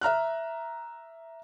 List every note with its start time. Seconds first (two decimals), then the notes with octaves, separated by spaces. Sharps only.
0.01 E5 A#5 F6 F#6